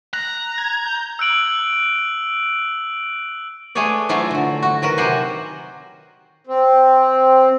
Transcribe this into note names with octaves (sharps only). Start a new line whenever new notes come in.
A#5 F#6
G#6
G6
E6 F#6 D7 F#7
G#3 A3 G#4 B4 C#5 D5
F#3 A3 E4 F4 C#5
D3 F#3
F#4
D#3 F#3 A#4 B4
C3 F#3 G4 C5 F#5 G#5
C4